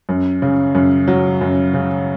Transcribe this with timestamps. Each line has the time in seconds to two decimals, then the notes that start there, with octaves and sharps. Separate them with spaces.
0.09 F#2
0.42 C#3
0.75 F#2
1.08 F#3
1.41 F#2
1.74 C#3